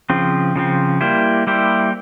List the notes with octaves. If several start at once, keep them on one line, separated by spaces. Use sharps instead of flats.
C#3 F3 C4
C#3 F3 C4
G3 A#3 E4 G4 C5
G3 A#3 E4 G4 C5